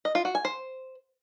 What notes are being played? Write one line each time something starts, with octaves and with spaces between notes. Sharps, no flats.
D#5
F4
F#4
G#5
C5